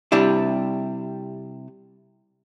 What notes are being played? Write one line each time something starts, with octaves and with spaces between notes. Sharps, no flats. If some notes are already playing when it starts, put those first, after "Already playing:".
C3 G3 D4 E4